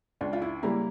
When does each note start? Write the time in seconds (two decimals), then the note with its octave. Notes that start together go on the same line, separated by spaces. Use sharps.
0.21 C#2 D4
0.33 F4
0.42 E4
0.63 C#3 G3 A#3 E4